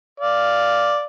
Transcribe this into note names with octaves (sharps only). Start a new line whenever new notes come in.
D5 F5